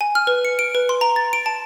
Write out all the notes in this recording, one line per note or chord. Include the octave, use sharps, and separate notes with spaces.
G#5
F6
B4
C#7
D7
B4
C6
A#5
A6
D7
A5